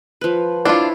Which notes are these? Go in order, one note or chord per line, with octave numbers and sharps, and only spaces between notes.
F3 B4
D4 E4 F4 C5 C#5